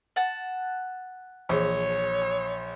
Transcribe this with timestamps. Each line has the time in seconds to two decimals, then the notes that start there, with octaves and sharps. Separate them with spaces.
0.16 F#5 A5
1.49 A#1 E3 G#4 C#5